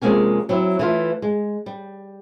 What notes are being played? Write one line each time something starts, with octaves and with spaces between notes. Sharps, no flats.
F2 C3 G#3 A#3 C#4 G#5
F#3 C4 E4
E3 A3 F4
G#3
G3